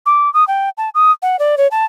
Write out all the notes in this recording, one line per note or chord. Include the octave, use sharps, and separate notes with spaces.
D6
D#6
G5
A5
D#6
F#5
D5
C#5
A5